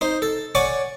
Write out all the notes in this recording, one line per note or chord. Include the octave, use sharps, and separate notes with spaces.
D#4 C5
A4
C#5 D5 F#5 G#5 D6